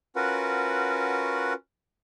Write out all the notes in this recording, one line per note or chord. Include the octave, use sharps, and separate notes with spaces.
C#4 F4 F#4 A#4 B4 F#5